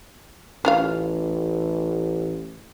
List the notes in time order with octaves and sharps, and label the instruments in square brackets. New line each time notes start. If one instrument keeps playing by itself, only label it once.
[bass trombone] A1 [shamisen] C#4 F4 F5